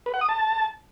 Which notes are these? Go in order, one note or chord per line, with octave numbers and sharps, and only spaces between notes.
B4
F#5
D#6
A5